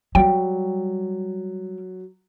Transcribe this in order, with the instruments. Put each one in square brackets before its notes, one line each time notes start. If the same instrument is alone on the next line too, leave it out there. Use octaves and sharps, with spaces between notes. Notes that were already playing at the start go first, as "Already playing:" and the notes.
[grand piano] F#3 [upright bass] G3 [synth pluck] G5